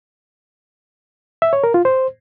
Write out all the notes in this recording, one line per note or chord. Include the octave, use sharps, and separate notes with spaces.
E5
C#5
A#4
F4
C5